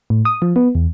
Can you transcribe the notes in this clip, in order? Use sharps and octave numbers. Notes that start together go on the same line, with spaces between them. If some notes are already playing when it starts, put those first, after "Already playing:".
A2
D#6
F3
B3
E2